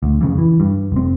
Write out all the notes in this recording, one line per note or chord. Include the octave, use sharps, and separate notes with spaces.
D2
F2 C#3
E3
G2
F1 C4